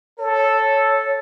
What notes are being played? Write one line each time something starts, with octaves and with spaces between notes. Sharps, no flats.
A4 C#5
C#5